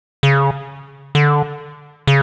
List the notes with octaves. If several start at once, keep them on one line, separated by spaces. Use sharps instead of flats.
C#3
D3
C#3